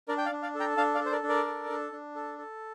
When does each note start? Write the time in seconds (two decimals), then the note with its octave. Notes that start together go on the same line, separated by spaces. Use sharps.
0.08 D4 A#4 D5
0.18 G5
0.26 D5 F5
0.31 D4
0.42 D5 F5
0.55 A4
0.60 G5 A#5
0.77 D4 F5 A5
0.95 D5 F5
1.00 A4
1.06 C5
1.12 A#4 D5
1.23 D4
1.29 A#4 D5
1.46 A4
1.69 D4
1.92 D4
2.16 A4
2.38 A4